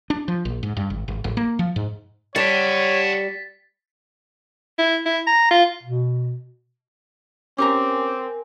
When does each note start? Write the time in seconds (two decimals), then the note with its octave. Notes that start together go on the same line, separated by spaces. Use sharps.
0.10 D4
0.28 F3
0.45 A#1
0.63 G#2
0.77 G2
0.90 G#1
1.08 G#1
1.24 A1
1.37 A#3
1.59 F3
1.76 G#2
2.36 G3 G4 C#5 F#5 A5 A6 B6
4.78 E4
5.06 E4
5.27 A#5
5.51 F4
5.83 B2
7.58 C4 C#4 G4 A#4 G#5 A#5 D6